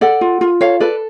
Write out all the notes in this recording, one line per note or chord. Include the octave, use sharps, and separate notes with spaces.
A4 D5 F#5
F4
F4
A4 C#5 F5
A4 B4 D5